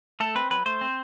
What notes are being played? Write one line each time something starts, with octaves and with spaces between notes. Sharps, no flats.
A3 A4
C4 B4
F#3 B4
A3 C5
C4